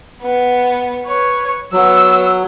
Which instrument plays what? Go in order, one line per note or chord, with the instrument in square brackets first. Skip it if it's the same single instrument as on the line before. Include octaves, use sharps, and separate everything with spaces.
[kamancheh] B3
B4 C#5
[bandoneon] F#3 [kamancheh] B3 E6